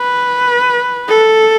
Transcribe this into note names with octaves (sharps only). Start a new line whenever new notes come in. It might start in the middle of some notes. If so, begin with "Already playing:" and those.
Already playing: B4
A4